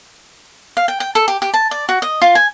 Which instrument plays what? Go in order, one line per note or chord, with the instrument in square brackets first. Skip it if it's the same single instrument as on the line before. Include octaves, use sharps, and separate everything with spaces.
[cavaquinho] F5
G5
G5
A4
G4
G4
A5
D5
F#4
D#5
F4
G#5